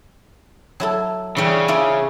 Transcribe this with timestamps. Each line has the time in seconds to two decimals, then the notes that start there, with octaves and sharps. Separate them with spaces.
0.80 F#3 E4 A4
1.37 C#3 E3 G3
1.68 E4 F4 D5